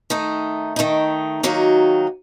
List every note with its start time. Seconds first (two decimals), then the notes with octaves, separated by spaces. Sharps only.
0.10 D#3 A3 D#4
0.76 D#3 A3 D#4
1.43 D#3 F#3 A#3 D#4 F#4